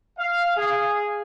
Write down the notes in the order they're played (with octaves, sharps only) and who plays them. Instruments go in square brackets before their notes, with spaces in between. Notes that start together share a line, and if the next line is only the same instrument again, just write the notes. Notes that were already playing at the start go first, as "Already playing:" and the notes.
[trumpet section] F5
G#4